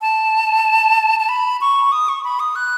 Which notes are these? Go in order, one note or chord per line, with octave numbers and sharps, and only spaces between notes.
A5
A5
B5
C#6
D#6
C#6
B5
D#6
F#6